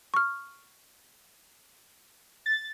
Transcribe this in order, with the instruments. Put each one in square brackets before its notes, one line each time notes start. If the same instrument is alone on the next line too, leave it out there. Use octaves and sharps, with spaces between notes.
[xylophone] C#6 F6
[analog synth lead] A6